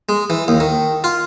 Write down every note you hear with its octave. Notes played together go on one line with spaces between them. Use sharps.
G#3
E3
D#2
D#3
F4